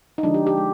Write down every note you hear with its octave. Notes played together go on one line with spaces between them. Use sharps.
D#4
D3 F3 G#3 D4
G4
G4
G#3